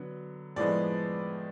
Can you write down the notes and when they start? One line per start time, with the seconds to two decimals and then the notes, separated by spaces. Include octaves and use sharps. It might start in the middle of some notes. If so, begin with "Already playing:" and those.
Already playing: D3 F#3 B3
0.56 A2 F3 G#3 B3 D5